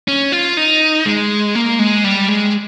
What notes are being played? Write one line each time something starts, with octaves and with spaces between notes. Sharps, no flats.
C#4
F4
D#4
G#3
A#3
G#3
G3
G#3